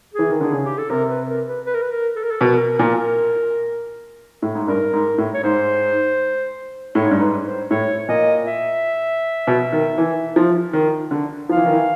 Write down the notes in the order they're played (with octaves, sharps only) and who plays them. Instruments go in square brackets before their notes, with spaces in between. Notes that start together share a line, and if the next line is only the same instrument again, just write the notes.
[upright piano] E3 [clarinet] G#4
[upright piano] D#3
[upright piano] D3 [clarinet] G#4
[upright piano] C#3
[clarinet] G4
A4
[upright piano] C3 [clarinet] A#4
[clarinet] B4
A#4
B4
B4
A#4
B4
A#4
A4
A#4
A4
[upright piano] B2 [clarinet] A#4
[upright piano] A#2
A2
G#2
[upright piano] G2 [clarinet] A#4
[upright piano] G#2
A2
[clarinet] C#5
[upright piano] G#2 [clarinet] C5
[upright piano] A2 [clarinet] C#5
[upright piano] G#2
G2
[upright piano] G#2 [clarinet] B4
[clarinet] C5
[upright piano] A2 [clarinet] C#5
[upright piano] A#2 [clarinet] D#5
[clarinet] E5
[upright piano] B2
D#3
E3
F3
D#3
D3
[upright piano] F3 [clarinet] F5
[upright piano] E3
D#3
E3